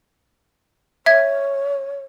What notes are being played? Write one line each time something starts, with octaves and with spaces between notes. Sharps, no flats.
C#5 E5 G#6